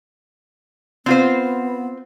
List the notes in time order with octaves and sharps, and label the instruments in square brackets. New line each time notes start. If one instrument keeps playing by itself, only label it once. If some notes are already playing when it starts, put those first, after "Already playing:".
[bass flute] B3 [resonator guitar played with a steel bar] C4 F4 C5